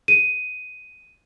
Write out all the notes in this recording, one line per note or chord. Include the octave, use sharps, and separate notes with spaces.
D#7